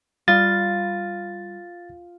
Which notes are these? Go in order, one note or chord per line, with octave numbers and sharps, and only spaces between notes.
G3 F4 A6